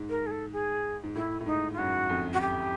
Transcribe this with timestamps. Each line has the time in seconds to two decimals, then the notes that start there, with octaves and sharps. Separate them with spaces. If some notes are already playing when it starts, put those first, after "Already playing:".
Already playing: G#2
0.10 A#4
0.27 G#4
0.31 A4
0.53 G#4
1.03 G#2
1.15 A2 E4
1.40 A2
1.46 G#2 D#4
1.73 F4
1.78 F#2 F#4
2.09 F2
2.33 F#4
2.41 G4